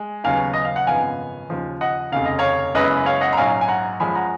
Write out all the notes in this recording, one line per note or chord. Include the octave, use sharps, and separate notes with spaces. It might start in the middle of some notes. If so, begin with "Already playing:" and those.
Already playing: G#3
D#2 C#3 F#3 B3 F5 G#5
D#5
F5
F#5
G#1 F#2 C#3 F3 B3 F5 G#5
D#2 C#3 F3
D#5 F#5
F1 D#2 C#3 F5
D#5
C#5 F5
F#1 F#2 C#3 G#3 B3 B4 D#5
C#5 F5
D#5 F#5
A#5
A#1 G#2 F#3 C#4 F5 G#5
G#5
F#5 A#5
F#2 F3 G#3 C#4 G#5 B5
F#5 A#5